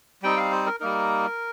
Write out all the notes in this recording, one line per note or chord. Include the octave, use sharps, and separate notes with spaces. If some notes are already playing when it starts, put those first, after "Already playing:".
G3 C4 D#4 G5
F5
C5
A#4
G3 A#3 D#4 A#4